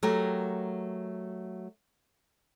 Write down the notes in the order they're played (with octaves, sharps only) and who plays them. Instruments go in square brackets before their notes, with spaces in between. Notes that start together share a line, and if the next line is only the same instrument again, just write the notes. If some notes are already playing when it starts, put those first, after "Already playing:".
[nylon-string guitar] F#3 A3 G4 A#4